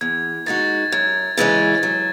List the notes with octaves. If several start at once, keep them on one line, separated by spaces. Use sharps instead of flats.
E2 G#6
D#3 G#3 D#4 F#4 A6
F#2 G#6
C#3 E3 G#3 C#4 A6
F#3